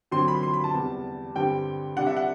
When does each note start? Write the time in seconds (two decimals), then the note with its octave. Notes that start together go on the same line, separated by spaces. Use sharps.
0.11 D3 F#3 C4 C6
0.28 B5
0.43 C6
0.54 B5
0.64 A5
0.73 E2 C3 G3
1.35 G2 D3 G3 C4 G5
1.97 C3 G3 D4 F#5
2.07 E5
2.17 F#5